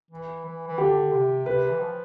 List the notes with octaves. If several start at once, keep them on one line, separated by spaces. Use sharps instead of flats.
E3
E3
E3
D3 G4
C3
C3 B4
E3
F3